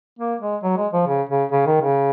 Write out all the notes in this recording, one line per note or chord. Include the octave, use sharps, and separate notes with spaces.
A#3
G#3
F#3
G#3
F3
C#3
C#3
C#3
D#3
C#3